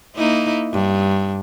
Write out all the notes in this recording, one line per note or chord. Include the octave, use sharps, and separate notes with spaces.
A#3 D#4 E4
G2